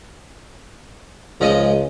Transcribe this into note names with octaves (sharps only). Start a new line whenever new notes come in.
C#2 F3 G#3 D#5